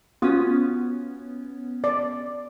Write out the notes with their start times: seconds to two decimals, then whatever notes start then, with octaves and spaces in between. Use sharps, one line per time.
0.22 B3 C#4 F4 F#4 D#6
1.84 D5